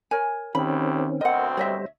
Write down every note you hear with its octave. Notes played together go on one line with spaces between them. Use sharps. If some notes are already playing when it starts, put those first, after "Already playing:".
A#4 C#5 G#5
D2 D#3 C4 C#4 G4 B5
D2 B2 C4 A#4 D#5 F#5
G3 C5 C#5 D#5 E5